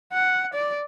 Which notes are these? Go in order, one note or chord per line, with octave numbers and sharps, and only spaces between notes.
F#5
D5